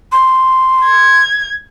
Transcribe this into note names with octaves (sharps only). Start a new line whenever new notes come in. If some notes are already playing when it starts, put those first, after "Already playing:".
C6
G#6